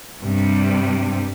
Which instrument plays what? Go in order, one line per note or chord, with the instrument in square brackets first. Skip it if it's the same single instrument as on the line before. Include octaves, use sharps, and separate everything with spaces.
[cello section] G2 C3 G3